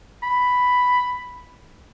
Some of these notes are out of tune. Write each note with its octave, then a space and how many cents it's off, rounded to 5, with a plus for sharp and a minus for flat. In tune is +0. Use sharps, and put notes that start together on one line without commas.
B5 +5